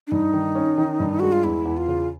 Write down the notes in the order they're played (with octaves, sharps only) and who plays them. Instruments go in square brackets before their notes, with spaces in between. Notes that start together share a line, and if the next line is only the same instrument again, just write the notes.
[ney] D4
[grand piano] G2 [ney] D#4
[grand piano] D#3
C#4
D#3
G2
[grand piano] G#3 [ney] F#4
[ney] F4
[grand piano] E2 [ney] E4
[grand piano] E2
[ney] F4
[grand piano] C#3